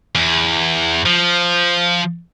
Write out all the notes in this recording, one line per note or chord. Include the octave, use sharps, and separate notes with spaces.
E2
F3